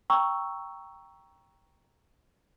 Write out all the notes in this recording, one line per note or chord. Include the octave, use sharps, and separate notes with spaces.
G5 A#5 C#6 E6